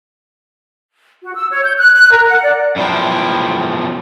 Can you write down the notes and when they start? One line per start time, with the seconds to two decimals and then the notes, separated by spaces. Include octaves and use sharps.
1.23 F#4
1.35 E6
1.50 C#5
1.63 G6
1.78 F#6
1.92 F#6
2.11 A#4
2.28 F#5
2.42 D5
2.76 F#2 B2 F3 E4 G5